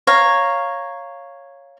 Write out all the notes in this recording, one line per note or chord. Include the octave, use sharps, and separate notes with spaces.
C#5 F5 A#5